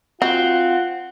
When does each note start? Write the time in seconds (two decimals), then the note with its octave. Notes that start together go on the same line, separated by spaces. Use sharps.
0.22 C4 F4 F#4 F#5